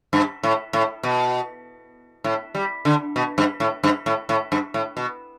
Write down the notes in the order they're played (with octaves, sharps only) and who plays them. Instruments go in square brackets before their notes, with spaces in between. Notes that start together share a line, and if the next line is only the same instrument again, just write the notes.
[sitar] G2
A2
A2
B2
A2
G3
D3
B2
G2
A2
G2
A2
A2
G2
A2
B2